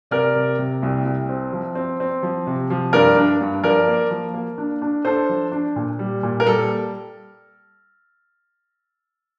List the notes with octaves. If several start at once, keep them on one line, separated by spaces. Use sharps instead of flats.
C3 A#4 D5
C3
C3
C2
C2
C4
F3
C4
C4
F3
C3
F3
G2 A#4 D5
D4
G2
F3 A#4 D5
A#3
F3
A#3
D4
D4
D4 A4 C5
F3
D4
A#2
G3
A#2
A#4
G3 A4